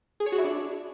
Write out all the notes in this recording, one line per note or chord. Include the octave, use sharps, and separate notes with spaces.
G#4
C#5
F#4
E4
D4